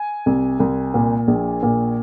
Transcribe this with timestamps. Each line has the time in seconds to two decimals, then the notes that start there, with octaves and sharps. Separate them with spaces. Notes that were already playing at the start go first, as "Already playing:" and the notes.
Already playing: G#5
0.26 C2
0.60 C2
0.94 A#2
1.28 A#1
1.63 A#2